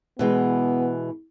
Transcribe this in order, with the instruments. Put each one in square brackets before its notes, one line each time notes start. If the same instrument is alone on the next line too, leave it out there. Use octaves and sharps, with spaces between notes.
[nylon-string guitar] B2 E3 G#3 [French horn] B3